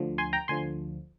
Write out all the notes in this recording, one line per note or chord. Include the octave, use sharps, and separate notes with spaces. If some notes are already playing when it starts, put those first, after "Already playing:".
Already playing: D2 D3 F3
G#5 C6
G5 A#5
D2 D3 F3 G#5 C6